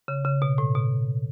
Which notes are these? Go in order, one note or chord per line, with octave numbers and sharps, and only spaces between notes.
C#3
C#3
B2
A2
B2